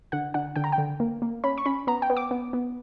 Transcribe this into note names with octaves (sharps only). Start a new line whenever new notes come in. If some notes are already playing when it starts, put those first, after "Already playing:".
D3 F#5
D3 F#5
D3 G5
A#5
G5
D3
A#3
A#3
C#4 B5
C#6
C#4 B5
B3 A#5
G5
B3
D6
B3
B3